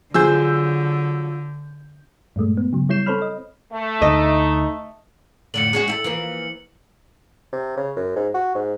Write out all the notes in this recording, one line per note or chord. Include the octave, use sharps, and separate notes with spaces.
D3 F3 F#3 G#4 C5 E6 G6
G2 A#2 G#3 A3
B3
C#3 F#3
G3 E4 C#5 G6 C7 E7
C4 A4 C5 C#5 B5 F6
D#5
A3
D2 D#4 D#5
F2 A2 D3 C#7 F#7
G#3 C#4 F#4
E4 G4 A4
E3 F3 A#3
C3
C#3
F#2
G#2
F#4
G#2